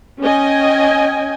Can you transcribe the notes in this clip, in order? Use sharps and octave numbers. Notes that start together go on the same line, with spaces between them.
C#4 D#5 G5 G#5